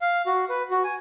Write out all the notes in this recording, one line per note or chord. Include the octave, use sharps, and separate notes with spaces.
F5
F#4
B4
F#4
G#5